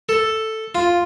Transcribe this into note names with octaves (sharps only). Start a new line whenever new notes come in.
A4
F4